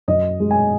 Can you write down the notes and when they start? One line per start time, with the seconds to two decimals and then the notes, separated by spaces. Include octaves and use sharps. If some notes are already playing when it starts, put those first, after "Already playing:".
0.08 F#2 D#5
0.40 G#3
0.51 G#5